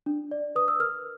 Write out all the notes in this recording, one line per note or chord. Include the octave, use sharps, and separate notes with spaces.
D4
D5
B4 D#6
E6
A#4 F6